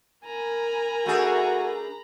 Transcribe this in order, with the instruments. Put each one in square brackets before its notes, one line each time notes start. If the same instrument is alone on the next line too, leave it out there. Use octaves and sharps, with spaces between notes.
[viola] A#4 G#5 [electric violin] A#5 B5
[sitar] A3 D4 G#4 [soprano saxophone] F#4